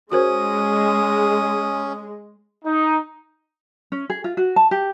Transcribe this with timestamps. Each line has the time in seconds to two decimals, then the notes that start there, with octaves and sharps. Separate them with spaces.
0.12 G#3 C#4 F#4 A#4 C5 D#6
2.65 D#4
3.92 C#4
4.10 G#4
4.24 F4
4.37 F#4
4.56 A5
4.71 G4